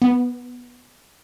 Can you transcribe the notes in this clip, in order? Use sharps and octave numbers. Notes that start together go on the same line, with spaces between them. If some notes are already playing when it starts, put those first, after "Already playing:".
B3